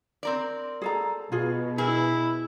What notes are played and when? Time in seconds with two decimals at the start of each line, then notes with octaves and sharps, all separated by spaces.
0.23 C4 A#4 D5
0.82 G#4 A4 A#5
1.32 B2 F4 G#4
1.78 E4 G#4 A#4